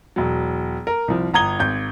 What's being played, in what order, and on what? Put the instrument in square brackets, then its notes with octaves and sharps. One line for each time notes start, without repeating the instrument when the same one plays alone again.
[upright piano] E1 F#3
A#4
C2 F3
G1 A#5 D#6 G#6 G7
G#1 G6